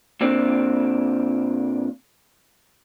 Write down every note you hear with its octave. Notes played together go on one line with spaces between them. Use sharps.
A#2 C4 D4